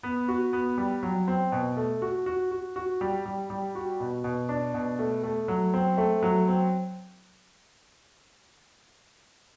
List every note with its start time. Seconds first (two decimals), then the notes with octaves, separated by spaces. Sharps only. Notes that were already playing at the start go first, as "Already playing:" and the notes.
0.03 B3
0.28 F#4
0.53 B3
0.78 G3
1.03 F#3
1.28 C4
1.52 B2
1.77 A3
2.02 F#4
2.26 F#4
2.51 F#4
2.76 F#4
3.01 G3
3.25 G3
3.50 G3
3.75 F#4
4.00 B2
4.24 B2
4.49 D4
4.74 B2
4.99 A3
5.24 A3
5.48 F#3
5.74 C4
5.98 A3
6.23 F#3
6.48 C4